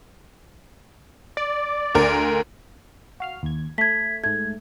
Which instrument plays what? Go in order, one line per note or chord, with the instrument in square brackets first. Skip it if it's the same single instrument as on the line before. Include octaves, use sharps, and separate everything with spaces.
[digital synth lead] D5
[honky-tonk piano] D2 A#4
[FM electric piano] F#4 F5 F6
D#2 G#6
[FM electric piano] A3 [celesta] G#6 B6
[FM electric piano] G#2 A3 [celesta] G#6